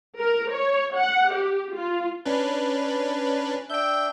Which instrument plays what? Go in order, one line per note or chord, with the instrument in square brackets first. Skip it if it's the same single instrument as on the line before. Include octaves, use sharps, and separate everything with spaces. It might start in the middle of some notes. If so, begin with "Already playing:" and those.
[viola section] A#4
C#5
F#5
G4
F4
[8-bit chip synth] C#4 D4 B4
[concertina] D4 E5 [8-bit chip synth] G5 G6